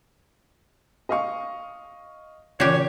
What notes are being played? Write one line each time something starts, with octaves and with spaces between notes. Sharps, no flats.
D#5 F5 C#6
A#2 C#3 E3 F#4 G4 C#5 D5